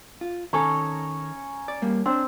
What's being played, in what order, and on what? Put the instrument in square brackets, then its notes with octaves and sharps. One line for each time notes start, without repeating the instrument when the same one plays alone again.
[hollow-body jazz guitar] F4
[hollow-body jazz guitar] D#3 A4 [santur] C#4 C#5 A#5
[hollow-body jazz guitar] D5
G3 A#3
[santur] C4 [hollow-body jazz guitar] D4